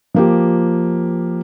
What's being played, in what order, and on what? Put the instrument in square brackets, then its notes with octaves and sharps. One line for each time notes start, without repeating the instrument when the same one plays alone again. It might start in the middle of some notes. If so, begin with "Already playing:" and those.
[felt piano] F3 A#3 G4